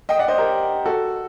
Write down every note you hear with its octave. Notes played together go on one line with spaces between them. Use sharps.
D#5 G5
D5 F#5
C5 D#5
G4 A#4
F#4 A4